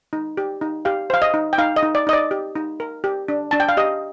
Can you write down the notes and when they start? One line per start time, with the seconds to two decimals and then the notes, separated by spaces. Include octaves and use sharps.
0.13 D#4
0.37 G4
0.61 D#4
0.85 G4 F5
1.10 C5 F5
1.22 D#5
1.34 D#4
1.53 G5
1.58 D#4 F5
1.76 D#5
1.83 D#4
1.95 D5
2.07 D#4 D#5
2.13 D5
2.31 G4
2.56 D#4
2.80 A#4
3.04 G4
3.28 D4
3.51 D4 A5
3.60 G5
3.69 F5
3.77 G4 D#5